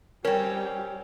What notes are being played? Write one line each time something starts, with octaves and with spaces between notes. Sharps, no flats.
G3 C4 C#4 G4 A#4 C#5 G5